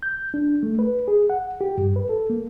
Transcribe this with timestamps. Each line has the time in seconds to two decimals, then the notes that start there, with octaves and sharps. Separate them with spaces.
0.03 G6
0.34 D4
0.63 A3
0.79 B4
1.08 G#4
1.30 F#5
1.61 G4
1.78 G2
1.96 B4
2.09 A4
2.30 A#3